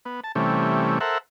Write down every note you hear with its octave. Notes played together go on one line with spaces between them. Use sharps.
B3
A5
C3 E3 G3 A3 C#4
A4 A#4 C5 E5 F#5